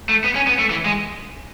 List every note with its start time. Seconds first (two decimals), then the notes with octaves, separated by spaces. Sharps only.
0.09 A3
0.24 B3
0.35 C#4
0.47 B3
0.59 A3
0.70 E3
0.85 G#3